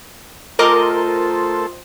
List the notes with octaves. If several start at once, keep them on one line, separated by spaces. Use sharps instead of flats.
A3 C4 F4 A4 A#4 C5 D#5 D6